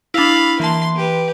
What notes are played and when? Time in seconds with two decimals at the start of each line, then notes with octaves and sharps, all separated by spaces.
0.14 D4 E4 F5 B5
0.60 E3 A#3 A5 C6
0.96 G4 B4